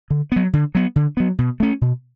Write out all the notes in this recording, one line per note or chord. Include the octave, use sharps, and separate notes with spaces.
D3
F#3 B3
D3
F#3 B3
D3
F#3 B3
B2
A3 C#4
B2